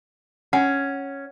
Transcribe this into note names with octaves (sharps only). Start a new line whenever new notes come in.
C#4 F#5